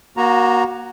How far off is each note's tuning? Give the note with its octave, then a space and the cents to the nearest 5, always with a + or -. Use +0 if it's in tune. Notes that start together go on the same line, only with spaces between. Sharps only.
A#3 +30 F#4 +0 A#5 +0